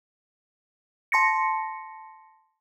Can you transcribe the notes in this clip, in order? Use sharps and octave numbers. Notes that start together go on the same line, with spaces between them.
A5 C6 A#6 C#7